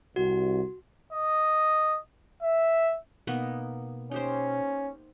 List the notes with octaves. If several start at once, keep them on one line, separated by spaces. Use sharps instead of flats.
C2 F#4
D#5
E5
B2 A#3 B3 D#4
C#4 D#4 G4 C5